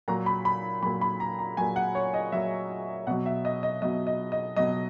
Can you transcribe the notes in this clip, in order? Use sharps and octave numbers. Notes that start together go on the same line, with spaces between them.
A#2 F#3 A#5
B5
B5
A#2 F#3 B5
B5
A#5
A#5
A#2 F#3 G#5
F#5
C#5
D#5
A#2 F#3 E5
B2 F#3 F#5
E5
D#5
D#5
B2 F#3 D#5
D#5
D#5
B2 F#3 D#5